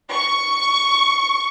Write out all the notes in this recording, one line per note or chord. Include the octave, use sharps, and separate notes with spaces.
C#6